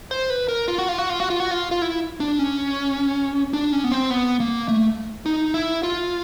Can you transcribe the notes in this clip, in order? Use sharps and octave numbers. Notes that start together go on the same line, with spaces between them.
C5
B4
A#4
F4
F#4
F4
F#4
F4
F#4
F4
F#4
F4
F4
E4
D4
C#4
D4
C#4
B3
C4
B3
A#3
A3
D#4
E4
F4